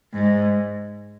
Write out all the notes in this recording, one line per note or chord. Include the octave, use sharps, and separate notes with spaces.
G#2